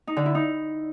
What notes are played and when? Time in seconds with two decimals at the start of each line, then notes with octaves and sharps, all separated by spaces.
0.07 D#4
0.17 D3
0.26 E4
0.35 D#4